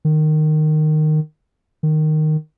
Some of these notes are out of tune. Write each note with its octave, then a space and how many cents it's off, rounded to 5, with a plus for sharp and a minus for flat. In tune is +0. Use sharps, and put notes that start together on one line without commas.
D#3 -15
D#3 -10